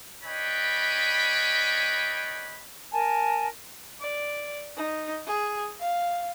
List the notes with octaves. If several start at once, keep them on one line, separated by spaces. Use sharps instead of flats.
D4 B4 C#5 D#5 G5 B5
A#4 G#5 A5
D5
D#4
G#4
F5